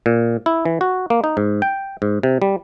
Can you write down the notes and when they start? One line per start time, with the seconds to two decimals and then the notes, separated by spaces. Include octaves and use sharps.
0.06 A#2
0.46 E4
0.65 E3
0.81 F#4
1.10 A#3
1.24 D#4
1.37 G#2
1.62 G5
2.02 G#2
2.23 C3
2.42 G3